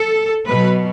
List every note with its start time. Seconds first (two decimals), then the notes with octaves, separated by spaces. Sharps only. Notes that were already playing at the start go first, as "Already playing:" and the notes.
Already playing: A4
0.45 B2 F#3 B4